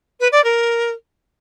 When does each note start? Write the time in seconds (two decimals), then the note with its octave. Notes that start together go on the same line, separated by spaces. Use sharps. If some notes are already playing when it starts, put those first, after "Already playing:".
0.20 B4
0.32 D5
0.44 A#4